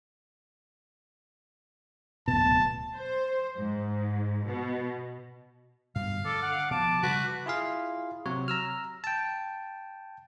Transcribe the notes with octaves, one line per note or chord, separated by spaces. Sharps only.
D1 G#1 B2 A5
C5
G#2
B2
G2 B2 D3 F5
D3 A4 D6
F#5
B2 F3 A5 D6
C#3 G3 F#4 B4
E4 F4 G#4 F5
C3 F#3 C#5
A#5 E6 F6
G5 A5